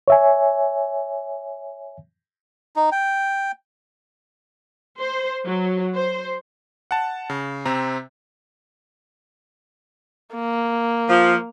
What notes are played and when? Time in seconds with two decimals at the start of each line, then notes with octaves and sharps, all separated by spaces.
0.08 C#5 E5 G#5
2.76 D#4
2.92 G5
4.99 C5
5.44 F#3
5.94 C5
6.91 F#5 A5
7.30 C#3
7.65 C3 C4 A#5
10.34 A#3
11.09 F3